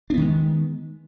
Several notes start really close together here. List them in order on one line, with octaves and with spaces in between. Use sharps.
D4 B3 D#3 G#3